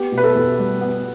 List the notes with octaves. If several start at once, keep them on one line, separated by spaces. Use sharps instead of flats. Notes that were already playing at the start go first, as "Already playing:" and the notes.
Already playing: B3 G4
B2
B4
A4
E2
G3
B3